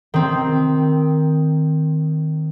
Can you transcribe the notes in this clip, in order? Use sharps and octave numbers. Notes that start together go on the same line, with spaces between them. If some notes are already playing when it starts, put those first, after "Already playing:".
D#3 C4